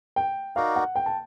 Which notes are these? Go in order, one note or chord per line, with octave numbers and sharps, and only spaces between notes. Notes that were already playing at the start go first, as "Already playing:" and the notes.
G5
D#4 F#4 A#4 D5 F5
F#5
G5
A5